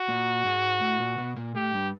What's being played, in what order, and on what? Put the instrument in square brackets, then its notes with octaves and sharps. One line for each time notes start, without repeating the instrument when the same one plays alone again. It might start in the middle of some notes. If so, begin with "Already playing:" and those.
Already playing: [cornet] F#4
[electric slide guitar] A#2 A#3
G#2 G#3
A2 A3
A#2 A#3
B2 B3
A#2 A#3
[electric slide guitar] A2 A3 [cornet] G4
[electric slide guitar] G2 G3